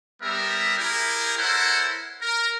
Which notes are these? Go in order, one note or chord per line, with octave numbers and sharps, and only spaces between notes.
G3 B3 G4 A#4 E5
E4 G4 G#4 A#4
E4 A4 A#4 C5 C#5 F#5
A#4